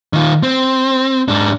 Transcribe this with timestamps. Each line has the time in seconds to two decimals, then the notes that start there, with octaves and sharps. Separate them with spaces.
0.13 D#3 F4
0.43 C4
1.28 G#2 D4